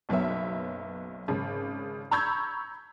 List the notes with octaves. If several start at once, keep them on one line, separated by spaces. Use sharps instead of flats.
F#1 B1 F#3 B3 E5
G#1 C#3
A#5 B5 C#6 E6 G6 G#6